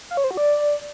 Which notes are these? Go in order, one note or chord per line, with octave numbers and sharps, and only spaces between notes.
F5
C#5
C5
F#4
D5